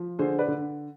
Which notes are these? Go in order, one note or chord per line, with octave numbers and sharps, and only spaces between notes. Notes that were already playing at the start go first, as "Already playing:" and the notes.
Already playing: F3
D3 G#4 C5
B4 D5
D3